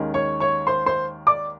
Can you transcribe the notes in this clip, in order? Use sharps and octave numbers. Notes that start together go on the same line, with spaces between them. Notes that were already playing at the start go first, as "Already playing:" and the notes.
Already playing: D#2 D#3 G#3 C#4
C#5 C#6
C#5 C#6
C5 C6
C5 C6
D5 D6